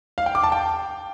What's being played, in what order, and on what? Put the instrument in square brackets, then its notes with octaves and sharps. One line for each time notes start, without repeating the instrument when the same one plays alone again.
[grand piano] F5
G5
D6
A5
G5